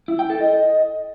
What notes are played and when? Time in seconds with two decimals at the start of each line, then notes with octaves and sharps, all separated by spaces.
0.08 E4
0.19 G5
0.30 A4
0.40 D#5